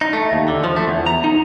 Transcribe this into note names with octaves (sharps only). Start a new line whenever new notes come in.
D#4
A3
D#2
D3
F3
A3
E2
A#5
D#4